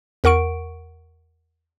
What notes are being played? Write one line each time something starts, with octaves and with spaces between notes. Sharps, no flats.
E2 A#4 F#5 C#6 D7